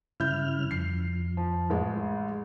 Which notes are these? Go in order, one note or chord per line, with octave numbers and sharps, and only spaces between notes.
G2 C#3 E4 F6 G6
F2 C7
F3
A1 G#3